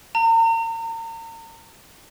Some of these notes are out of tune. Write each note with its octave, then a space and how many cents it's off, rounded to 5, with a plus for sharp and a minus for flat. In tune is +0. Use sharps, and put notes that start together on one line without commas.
A#5 -40